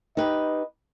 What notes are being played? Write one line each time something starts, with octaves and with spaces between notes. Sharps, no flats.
D#4 G4 B4 D#5